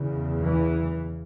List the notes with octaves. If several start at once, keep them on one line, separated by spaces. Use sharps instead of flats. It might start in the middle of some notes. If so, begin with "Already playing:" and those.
Already playing: E2 C#3
E3